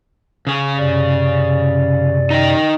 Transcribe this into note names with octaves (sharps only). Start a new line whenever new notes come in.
C#3 G#4
F#2 C3 D5
D#4 D#5 G5